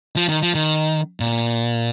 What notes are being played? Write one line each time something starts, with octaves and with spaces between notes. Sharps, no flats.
F3
D#3
F3
D#3
A#2